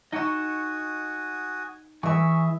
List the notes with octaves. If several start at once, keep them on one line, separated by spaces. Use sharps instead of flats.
D#4 F#4 D#5 F#5 G#5 C#6 D#6 E7
E3 G#4 E5 G#5 C#6